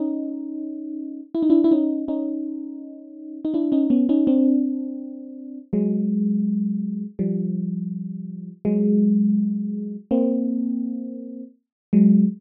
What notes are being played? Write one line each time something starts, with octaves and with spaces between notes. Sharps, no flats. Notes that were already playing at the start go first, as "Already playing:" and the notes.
Already playing: C#4 D#4
E4
D#4
D4 E4
E4
C#4 D#4
C#4 D#4
D#4
D4 E4
C#4 D#4
B3 C#4
C#4 D#4
C4 D4
F#3 G#3
F3 G3
F#3 G#3
A#3 C4
F#3 G#3